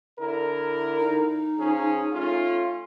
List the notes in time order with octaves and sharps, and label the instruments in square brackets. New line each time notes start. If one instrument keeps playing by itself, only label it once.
[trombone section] D3 E4 A#4
[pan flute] D#4
[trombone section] F3 C#4 G#4
A3 C#4 F4